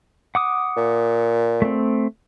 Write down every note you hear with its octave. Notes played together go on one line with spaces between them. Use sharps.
F#5 D6 D#6
A#2
A3 C4